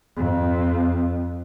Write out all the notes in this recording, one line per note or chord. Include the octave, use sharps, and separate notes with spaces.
F2